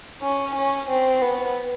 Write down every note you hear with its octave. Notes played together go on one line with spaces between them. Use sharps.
C#4
C#4
C4
B3